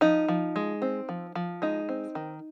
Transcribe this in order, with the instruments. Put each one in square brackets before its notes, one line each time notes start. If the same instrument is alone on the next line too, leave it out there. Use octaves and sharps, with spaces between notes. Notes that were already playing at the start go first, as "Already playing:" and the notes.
[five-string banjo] F3 D#4
F3
G#3
C4
F3
F3
G#3 D#4
C4
D#3